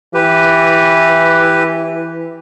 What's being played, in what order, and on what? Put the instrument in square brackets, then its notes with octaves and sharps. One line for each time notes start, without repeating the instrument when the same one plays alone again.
[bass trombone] E3 [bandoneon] G4 B4